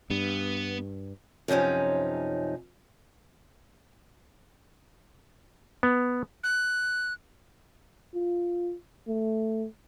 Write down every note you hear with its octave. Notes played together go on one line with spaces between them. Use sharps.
G2 B3
F#2 C3 F3 C#4 D#4
B3
F#6
F4
A3